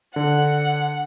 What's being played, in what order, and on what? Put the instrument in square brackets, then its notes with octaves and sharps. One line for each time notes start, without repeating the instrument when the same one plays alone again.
[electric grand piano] D3 [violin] F#5